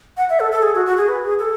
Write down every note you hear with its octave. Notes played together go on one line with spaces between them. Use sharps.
F#5
E5
A4
A4
G#4
F#4
F#4
G#4
B4
G#4
A4